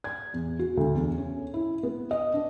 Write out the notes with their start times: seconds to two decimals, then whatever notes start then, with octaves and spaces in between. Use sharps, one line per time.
0.04 G#6
0.33 E2
0.59 F#4
0.77 D2
0.95 E2
1.18 C#4
1.54 E4
1.83 B3
2.11 D#5
2.34 D4